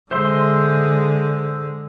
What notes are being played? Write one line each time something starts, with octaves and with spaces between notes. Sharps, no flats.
D3 G#3 C5 E5 C6